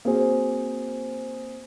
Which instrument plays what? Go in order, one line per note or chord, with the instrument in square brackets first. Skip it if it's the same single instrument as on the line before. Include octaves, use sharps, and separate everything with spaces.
[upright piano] A#3 C4 F#4 G#4 C5